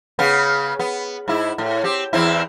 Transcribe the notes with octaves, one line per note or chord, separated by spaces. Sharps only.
C#3 B3
B3
G#2 E4
A2
C4 G4
E2 C4 E4